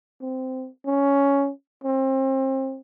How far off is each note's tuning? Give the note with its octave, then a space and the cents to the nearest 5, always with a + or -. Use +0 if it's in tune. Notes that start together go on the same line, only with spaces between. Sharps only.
C4 -15
C#4 +10
C4 +30